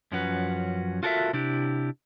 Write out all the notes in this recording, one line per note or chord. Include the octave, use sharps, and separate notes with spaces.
F#2 F3 C#4 F#4 B4
F4 F#4 A4 A#4 D5 E5
C3 D4 E4 G4